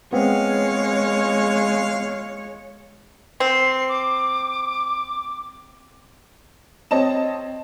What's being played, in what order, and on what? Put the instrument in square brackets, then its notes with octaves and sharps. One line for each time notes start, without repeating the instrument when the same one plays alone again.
[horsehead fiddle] G#3 C#5 [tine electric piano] B3 C4 [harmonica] F5
[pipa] C4 [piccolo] C7
[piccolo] D6
[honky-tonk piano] C4 C#5 D#5 A5 E7